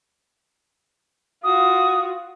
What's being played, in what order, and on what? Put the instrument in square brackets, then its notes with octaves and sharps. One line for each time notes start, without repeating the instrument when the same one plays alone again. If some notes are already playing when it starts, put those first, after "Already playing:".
[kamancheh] F4 F#4 [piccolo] D#6